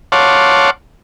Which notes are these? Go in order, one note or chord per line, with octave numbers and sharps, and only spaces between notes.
C#5 F5 F#5 A5 C6 D6